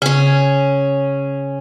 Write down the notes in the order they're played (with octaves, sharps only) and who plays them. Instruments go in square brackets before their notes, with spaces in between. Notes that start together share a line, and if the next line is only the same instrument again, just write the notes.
[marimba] C#3 [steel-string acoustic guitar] C#4 G#4